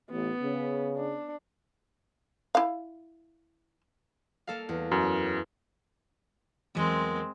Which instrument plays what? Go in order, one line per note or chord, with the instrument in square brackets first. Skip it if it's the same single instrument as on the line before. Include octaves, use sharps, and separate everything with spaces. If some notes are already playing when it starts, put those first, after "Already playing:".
[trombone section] A1 [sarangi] B3
[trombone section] C#3
[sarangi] D4
[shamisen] E4 F5
[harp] A#3 A4 F5
E2
[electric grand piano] F#2
[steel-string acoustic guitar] E2 F#3 A#4 [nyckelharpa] G#3 C4